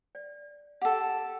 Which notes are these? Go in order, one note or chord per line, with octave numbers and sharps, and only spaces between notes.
D5
G4 A4 F#5